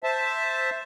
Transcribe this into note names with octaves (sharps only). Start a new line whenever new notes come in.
C5 E5 A5